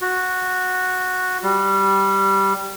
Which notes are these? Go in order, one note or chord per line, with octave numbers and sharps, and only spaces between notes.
F#4
G3